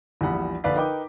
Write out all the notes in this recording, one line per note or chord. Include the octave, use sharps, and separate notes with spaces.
A#1 E2 G3 F#5 B5
A#1 D3 B4 D5 F5 B6
D#4 A#4 B4 D#5 G5 D6